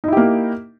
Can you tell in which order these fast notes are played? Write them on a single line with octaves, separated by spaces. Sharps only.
D#4 E4 G4 A#3